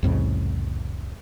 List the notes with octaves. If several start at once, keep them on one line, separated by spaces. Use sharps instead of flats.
C2 F2 A2 C#3